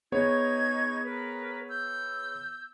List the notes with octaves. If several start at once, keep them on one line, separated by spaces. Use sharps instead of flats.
B3 D#4 G#4 C#5 C#6 G#6
A#4 B4
E6 G6